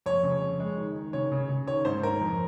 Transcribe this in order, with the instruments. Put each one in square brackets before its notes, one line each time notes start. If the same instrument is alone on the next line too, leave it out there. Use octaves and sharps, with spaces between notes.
[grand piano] F2 C#5
C#3
F2
G#3
D#3
D#3
C#3 C#5
C#3
C#3
D#3 C#5
G#2 C5
G#2 A#4
F2